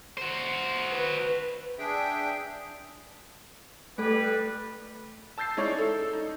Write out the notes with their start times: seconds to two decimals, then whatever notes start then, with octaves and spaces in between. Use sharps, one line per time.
0.17 F#4 C5
0.91 B4
1.79 D4 G#4 E5 G5
3.98 G3 A3 A4 B4
5.38 A5 E6 G6 A6 C7
5.57 G#3 C#4 D#4 E4 C#5 D5
5.78 A4 E6
6.13 D#4